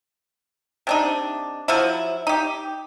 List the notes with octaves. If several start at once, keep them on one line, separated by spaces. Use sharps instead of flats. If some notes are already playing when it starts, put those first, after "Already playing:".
C3 D4 D#4
F3 F#3 E4
D#4 G4